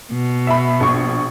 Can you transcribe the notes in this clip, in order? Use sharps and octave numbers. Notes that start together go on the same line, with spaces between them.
B2
E5 B5
A#1 C#6